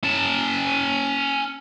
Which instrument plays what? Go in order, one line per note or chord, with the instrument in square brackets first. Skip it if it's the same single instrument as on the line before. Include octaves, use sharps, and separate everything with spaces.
[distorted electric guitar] C#4 A5